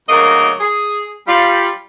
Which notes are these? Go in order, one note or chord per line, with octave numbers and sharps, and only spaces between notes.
D2 C#3 F#3 A#3 A#4 D#5
G#4
G3 F4